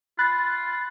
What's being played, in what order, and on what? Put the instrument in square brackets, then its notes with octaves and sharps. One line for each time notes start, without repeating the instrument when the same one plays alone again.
[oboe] F4 [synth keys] B5 F#6 A6